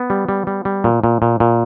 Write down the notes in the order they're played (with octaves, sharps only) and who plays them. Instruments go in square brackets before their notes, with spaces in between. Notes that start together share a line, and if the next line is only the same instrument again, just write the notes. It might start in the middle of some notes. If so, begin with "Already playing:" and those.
Already playing: [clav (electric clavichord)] B3
G3
G3
G3
G3
A#2
A#2
A#2
A#2